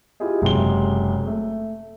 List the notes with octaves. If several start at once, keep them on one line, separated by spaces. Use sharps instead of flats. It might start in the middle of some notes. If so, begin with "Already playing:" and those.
E4 F4 G4 G#4 D#5
F#1 C3 G#3 C6 G7
A3